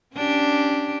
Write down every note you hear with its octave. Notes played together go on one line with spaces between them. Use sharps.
C#4 D4 G4